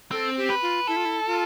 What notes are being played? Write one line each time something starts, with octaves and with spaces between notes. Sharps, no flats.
C4 A4
G4
B4
F4
E4 A4
F4
E4
F4